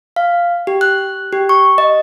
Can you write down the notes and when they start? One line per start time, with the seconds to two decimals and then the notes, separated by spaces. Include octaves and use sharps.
0.16 F5
0.67 G4
0.81 F#6
1.33 G4
1.49 C#6
1.78 D#5